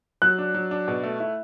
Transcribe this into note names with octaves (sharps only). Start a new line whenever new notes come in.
F#3 F#6
D4
F#3
D4
B2
A3
E4